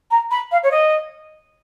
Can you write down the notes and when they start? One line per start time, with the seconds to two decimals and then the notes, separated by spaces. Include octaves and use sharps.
0.11 A#5
0.31 B5
0.51 F5
0.63 C#5
0.71 D#5